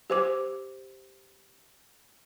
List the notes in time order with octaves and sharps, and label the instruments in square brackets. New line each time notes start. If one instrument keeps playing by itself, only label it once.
[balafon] G4 C5 D6